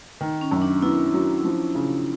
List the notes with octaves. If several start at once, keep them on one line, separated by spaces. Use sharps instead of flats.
D#3
C#4
F#2
D4
B3 E4
F#3
F3
C#3